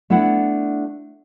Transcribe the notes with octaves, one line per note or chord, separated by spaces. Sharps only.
A3 B3 D4 E4 F#5